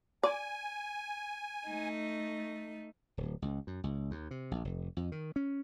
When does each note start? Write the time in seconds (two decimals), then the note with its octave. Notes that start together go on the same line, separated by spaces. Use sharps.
0.23 D5 G#5
1.66 A3 D#4
3.17 D1
3.42 C#2
3.67 F#2
3.84 C#2
4.11 D#2
4.31 C3
4.51 A#1
4.65 F1
4.97 F2
5.12 D#3
5.36 C#4